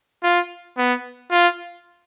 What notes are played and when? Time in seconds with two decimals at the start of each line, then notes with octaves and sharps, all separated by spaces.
0.24 F4
0.78 B3
1.31 F4